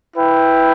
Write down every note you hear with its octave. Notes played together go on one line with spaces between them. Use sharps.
E4 B4 G5